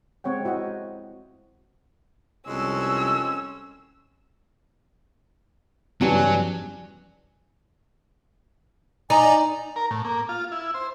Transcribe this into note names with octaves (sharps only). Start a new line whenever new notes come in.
G#3 C4 C#5 F#5 G5
E4 F#4 C5 D#5 F5
C2 F2 G#3 C4 C#4 E6
E2 G2 C#3 F#3 D4 G#5
D#4 D5 G#5 A#5
A#4
A2
A#3
F4
E4
C5